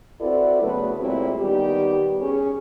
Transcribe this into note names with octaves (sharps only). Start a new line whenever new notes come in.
C4 E4 F#4 A4 B4 D5
C#3 F#3 A3 B3 B4
A#2 F#3 G#3 C4 E4 G4
D#3 G3 B3 G4
C#4 G#4